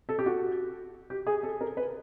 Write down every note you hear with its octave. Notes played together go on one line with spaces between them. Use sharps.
A4
G4
F#4
G4
G#4
A4
A#4
B4